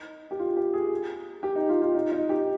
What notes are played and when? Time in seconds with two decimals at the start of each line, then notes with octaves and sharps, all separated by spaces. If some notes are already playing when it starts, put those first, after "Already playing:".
Already playing: D#4
0.31 G4
0.39 F4
0.57 G4
0.73 G#4
1.43 G4
1.55 D#4
1.69 F4
1.82 F4
1.95 D#4
2.12 D#4
2.29 G4